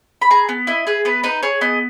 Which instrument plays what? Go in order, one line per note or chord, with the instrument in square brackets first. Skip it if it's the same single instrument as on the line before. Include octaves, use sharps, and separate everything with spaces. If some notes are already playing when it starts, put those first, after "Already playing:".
[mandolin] B5
G#4 A#5
B3
E4 D#5
G#4 B4
B3 B4
D#4 B4
G#4 C#5
B3 D#5